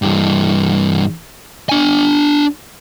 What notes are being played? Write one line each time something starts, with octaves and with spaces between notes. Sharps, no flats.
G2 E3
D4 G#5